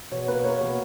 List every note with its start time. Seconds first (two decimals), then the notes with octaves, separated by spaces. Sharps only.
0.11 B2 C#5
0.28 A#3 B4
0.44 A#3 C#5
0.61 B2